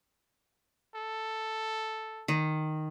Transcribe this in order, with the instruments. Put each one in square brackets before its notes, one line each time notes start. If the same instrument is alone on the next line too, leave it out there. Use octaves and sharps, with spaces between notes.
[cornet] A4
[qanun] D#3